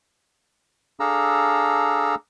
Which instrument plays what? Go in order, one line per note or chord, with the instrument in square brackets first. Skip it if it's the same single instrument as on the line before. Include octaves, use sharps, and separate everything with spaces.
[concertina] D4 G#4 A4 F5 A#5 E6